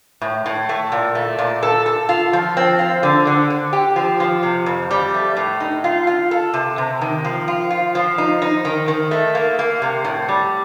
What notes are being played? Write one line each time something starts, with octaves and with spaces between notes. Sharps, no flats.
A2
A2
A3
A#2
A3
A#2
A4
A4
F4
F3
C4
F4
D3
D3
D3
G4
F3
F3
C3
F2
G3
A3
A2
D#4
F4
F4
A4
C3
C3
D#3
F3
F4
F4
F3
D#4
D#4
D#3
D#3
A3
A#3
A#3
C3
A2
G3